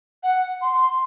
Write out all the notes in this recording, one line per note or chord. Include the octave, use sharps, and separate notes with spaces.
F#5
C6
C6